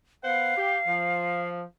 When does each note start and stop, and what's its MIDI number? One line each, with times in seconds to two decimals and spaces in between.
0.24 0.53 59
0.24 0.53 72
0.24 1.48 77
0.24 0.53 78
0.57 0.79 67
0.87 1.62 53